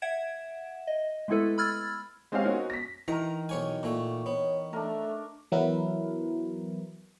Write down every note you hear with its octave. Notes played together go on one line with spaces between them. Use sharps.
E5 F#5 G#6 D7 E7
D#5
G#3 A3 B3 E4 A4 B4
B5 E6 F6 G#6 A6
G#3 C4 C#4 G4 C#5 F5
A#3 C4 C#4 D#4 F#4 C#5
A#6 B6
D#3 E3 A#4 A#5
B1 C#5 G#5
A#2 A3 C#6
B3 C#5
A3 D4 A#4
E3 F#3 B3 E4 A#4 B4